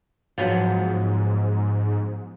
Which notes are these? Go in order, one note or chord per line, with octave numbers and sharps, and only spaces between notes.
G#2 F3 F#3 B3